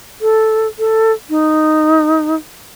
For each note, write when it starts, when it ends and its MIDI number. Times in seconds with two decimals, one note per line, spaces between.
0.21 0.67 69
0.79 1.12 69
1.30 2.35 63